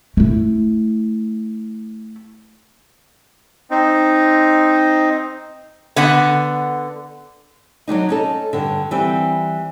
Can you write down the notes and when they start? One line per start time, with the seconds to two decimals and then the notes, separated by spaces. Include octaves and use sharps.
0.17 A3 E4
3.71 C4 D#4
5.96 D3 B3 F#5
7.88 F#3 G#3 D4 D#4
8.09 C#4 D#4 A4
8.53 G2 D3
8.91 E3 G3 C4